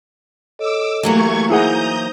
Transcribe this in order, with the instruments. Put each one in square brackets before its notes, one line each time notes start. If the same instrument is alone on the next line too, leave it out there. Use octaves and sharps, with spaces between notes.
[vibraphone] A4 C#5 D#5 [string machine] D6 E6
[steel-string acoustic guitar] E3 F#3 A#3 [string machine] A3 C#6 G#6 [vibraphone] G4
[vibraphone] D#4 C5 [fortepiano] E4 G#4 F#5 [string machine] A#5 D#6 G6